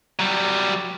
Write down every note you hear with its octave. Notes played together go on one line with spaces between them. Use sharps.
F#3 G3